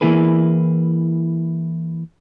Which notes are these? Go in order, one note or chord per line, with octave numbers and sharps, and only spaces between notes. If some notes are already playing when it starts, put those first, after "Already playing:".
E3 A#3 E4 G#4 B4